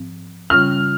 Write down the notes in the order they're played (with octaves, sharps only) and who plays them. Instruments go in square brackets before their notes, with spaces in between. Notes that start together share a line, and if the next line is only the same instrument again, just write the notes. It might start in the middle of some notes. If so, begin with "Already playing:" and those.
Already playing: [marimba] G#2 F3 C4
[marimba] C#3 G3 C#4 F4 [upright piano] F6